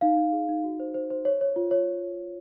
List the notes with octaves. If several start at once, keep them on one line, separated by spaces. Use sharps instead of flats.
D#4 F5
D#4
G#4
D#4
F#4
C5
C5
C5
C#5
C#5
F4
C#5